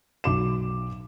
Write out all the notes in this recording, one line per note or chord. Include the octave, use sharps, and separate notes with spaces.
B1 D6 E7